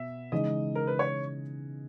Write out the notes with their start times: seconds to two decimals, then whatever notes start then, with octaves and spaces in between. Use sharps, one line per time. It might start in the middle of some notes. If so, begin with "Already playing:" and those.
Already playing: B2 B3 E5
0.32 C#3 E3 G#3 D#4 G#4 D#5
0.75 A#4
0.87 B4
0.99 C#5